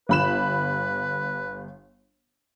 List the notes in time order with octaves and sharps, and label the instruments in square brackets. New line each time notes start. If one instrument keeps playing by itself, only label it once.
[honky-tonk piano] G1 B5 E7 [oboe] B4